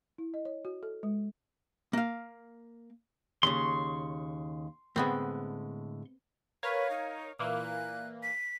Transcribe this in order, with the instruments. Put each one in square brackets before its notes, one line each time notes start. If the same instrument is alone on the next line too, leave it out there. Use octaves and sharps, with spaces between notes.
[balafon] E4
D#5
C#5
F#4
A4
G#3
[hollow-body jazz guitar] A#3 F5
[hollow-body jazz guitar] D#2 A#2 C#3 [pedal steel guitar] C6 C#6
[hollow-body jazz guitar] A2 D3 G#3 [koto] B3 C4
[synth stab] A#4 C#5 F5 [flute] B4
[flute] D#4
[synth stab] A#2 E3 A#3 [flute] F#6
[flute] B6